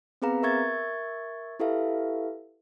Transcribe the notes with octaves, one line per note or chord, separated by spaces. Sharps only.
B3 C4 G#4 B4 F5 A#5
A#4 E5 C#6 G#6 A6
E4 G4 A4 B4 E5 F5